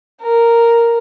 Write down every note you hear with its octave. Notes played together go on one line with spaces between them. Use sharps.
A#4